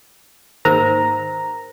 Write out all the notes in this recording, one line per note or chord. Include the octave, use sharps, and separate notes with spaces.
G#2 D#3 A#3 A#4 C5 A#5